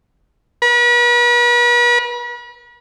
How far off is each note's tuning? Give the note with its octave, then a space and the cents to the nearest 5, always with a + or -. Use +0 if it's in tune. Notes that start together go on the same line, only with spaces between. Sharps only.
B4 -40